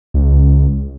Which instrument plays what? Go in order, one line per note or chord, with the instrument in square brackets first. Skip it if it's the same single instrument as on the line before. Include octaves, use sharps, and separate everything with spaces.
[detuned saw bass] C#2